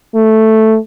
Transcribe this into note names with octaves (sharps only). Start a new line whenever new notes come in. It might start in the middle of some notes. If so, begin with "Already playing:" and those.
A3